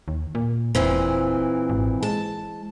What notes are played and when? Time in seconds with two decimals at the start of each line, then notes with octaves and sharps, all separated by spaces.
0.08 D#2
0.35 A#2
0.75 E1 A#2 E3 C4
1.70 G#1
2.03 G#3 A5